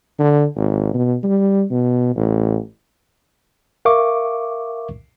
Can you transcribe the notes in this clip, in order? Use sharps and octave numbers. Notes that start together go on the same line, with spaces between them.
D3
G#1
B2
G3
B2
A1
A#4 E5 F5 C#6 D6